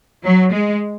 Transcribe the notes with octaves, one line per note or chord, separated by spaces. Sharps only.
F#3
G#3